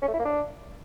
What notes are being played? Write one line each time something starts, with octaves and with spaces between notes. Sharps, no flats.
C#4
A3
E4
A#3
D4